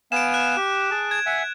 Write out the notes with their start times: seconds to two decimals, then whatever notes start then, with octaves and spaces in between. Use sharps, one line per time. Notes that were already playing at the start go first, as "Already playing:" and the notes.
0.12 B3 F5 G#5 D7 E7
0.34 F#6
0.56 G4
0.91 G#4 A5
1.11 G#6
1.26 E5 F#5 G#5